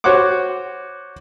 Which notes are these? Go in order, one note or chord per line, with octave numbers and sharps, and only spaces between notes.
F#4 C5 C#5 F#5 D6